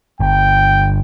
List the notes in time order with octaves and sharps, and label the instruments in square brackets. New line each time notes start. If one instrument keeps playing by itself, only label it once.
[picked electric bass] G1 [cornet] G5